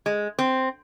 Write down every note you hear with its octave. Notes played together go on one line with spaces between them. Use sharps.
G#3
C4